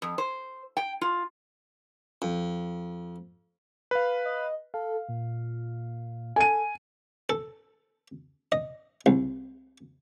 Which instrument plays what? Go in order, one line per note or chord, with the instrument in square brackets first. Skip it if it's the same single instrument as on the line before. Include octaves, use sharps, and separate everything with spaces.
[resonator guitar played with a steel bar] F2
C5
G5
F4
[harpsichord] F2
[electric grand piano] B4 F5
[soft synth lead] D#5
[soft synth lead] A4 [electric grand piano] F5
[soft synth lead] A#2
[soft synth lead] A4 [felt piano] G#5 D#7
[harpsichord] A4
D#5
C2